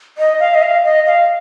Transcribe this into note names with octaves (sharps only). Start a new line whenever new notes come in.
D#5
F5
D#5
F5
D#5
F5